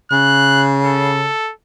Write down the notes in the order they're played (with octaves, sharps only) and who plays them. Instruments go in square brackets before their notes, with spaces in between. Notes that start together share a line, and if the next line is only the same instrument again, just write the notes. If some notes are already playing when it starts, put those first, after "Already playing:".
[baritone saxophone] C#3 [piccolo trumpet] F#6
[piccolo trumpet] A4